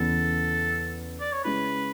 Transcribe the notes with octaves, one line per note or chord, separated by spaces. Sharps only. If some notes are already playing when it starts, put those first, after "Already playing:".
Already playing: E2 C#3 E3 B3 A4
D5
C#5
C#3 G#3 C#4 E4 B4